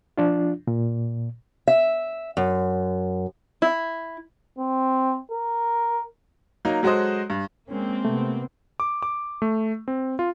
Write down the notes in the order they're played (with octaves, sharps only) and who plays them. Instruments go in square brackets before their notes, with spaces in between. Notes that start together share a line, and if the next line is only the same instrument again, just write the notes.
[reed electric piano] F3 D4 F4
A#2
[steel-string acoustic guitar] E5
F#2
[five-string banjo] E4
[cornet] C4
A#4
[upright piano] F#3 A#3 D#4
F#3 G#3 F#4 A4 C5 D#5
G2
[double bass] G#3 C#4 [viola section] A#3 C4
[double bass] C3 B3 [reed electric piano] A3
[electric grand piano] D6
D6
A3
C4
F4